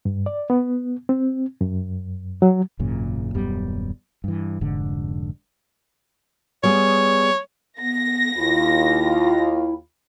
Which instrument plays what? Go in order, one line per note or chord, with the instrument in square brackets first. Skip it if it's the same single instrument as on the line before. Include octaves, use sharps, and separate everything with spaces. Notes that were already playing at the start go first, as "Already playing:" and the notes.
[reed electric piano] G2
D5
B3
C4
F#2
F#3
[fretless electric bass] G#1 F#2 A#2 C#3
D#1 F#2 G3 B3
G2 E3
F1 G#2 D3
[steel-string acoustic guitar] G3 B3 G#4 [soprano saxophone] C#5
[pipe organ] B3 [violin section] A#6
[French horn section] D#2 F4 [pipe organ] E4